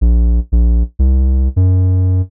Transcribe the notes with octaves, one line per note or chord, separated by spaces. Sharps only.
A#1
A#1
C2
F#2